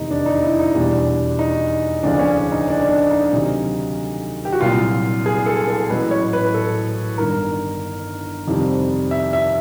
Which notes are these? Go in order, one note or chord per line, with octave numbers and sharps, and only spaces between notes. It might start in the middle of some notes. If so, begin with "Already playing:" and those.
Already playing: F1 E2 C3 D#3 D#4
D4
D#4
E4
D#4
E2 B2 G3 D4
D#4
D2 C#3 F3 D4
C#4
D4
D#4
D4
D4
D#4
D2 C3 D#3 F#3
G4
F#4
C2 A#2 F#3 F4
G#4
A4
A4
A1 A2 F#3 B4
C#5
B4
A4
G1 G2 D#3 A#4
F2 C3 D#3 G3
E5
E5